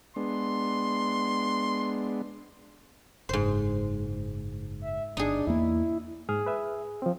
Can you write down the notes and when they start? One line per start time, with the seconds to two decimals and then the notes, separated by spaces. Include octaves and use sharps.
0.16 G#3 B3 D4 C6
3.29 F#1 G#2 C5
4.81 E5
5.17 G1 D4 D#4 G#4
5.47 E2 A#3 E4
6.29 G#2 G#4 F6
6.46 B4 E5
7.02 F3 C4